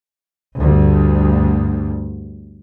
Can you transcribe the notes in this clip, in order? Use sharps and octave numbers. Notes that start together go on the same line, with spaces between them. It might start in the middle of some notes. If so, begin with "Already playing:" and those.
D2 G2